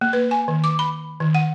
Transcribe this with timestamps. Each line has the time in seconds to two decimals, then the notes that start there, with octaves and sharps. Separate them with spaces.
0.01 A#3
0.13 B4
0.31 G#5
0.48 D#3
0.64 D6
0.79 B5
1.20 D#3
1.35 F#5